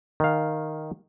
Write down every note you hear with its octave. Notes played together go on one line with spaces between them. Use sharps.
D#3 F5